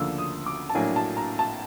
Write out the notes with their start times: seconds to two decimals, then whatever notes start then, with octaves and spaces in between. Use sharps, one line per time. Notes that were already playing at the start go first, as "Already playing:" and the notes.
Already playing: D2 C#3 F3 A#3 D4 E6
0.18 D#6
0.46 D6
0.70 A5
0.75 A#1 A2 F#3 A#3 D4 G#5
0.96 A5
1.17 A#5
1.39 A5